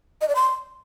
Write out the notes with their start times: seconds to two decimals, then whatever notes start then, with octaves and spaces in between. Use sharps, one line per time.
0.21 D#5
0.28 D5
0.35 C6